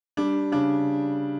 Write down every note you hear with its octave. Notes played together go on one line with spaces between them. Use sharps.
G3 D4
C#3 D4